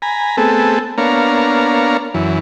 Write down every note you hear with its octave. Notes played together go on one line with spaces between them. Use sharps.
G#5 A#5 B5
A3 B3 C4 G#4 A4
A#3 B3 D4 C#5 F5 A#5
F#2 E3